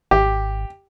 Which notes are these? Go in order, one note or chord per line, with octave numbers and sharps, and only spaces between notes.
G#1 G4